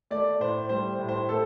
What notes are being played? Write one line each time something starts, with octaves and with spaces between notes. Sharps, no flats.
A3 D5
A2 C5
G3 C5
A2
C5
A3 A4